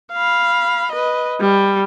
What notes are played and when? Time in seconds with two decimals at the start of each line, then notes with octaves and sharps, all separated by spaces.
0.13 F5 B5
0.92 B4 D#5
1.41 G3